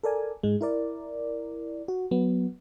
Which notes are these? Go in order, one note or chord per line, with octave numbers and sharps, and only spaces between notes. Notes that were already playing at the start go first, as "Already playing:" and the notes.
A4 A#4 D5 G#5
G#2 G#3
E4 A#4 D5
F#4
F#3 B3